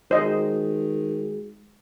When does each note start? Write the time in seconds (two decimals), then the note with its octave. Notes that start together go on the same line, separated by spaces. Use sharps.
0.11 D#3 G#3 F#4 G#4 C5 D#5